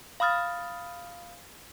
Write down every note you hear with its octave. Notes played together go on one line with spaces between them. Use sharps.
F5 B5 D#6 F6 A6